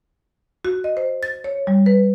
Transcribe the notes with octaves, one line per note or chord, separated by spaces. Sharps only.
F#4
D#5
C5
A6
C#5
G3
B4